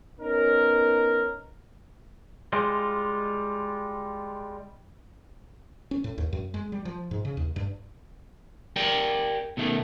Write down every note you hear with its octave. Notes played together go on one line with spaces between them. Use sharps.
B3 C#4 D#4 A#4
G3 G#3 F4
C#4
A2
D#2
F#2
G#3
G3
F3
G#2
C#3
D#2
G2
G4 A#4 D5 G5
B2 D#3 A3